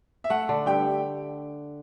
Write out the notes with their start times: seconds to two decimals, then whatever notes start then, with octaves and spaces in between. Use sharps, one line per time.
0.24 E5
0.30 A3 F#5
0.49 D3
0.66 G2 G4 G5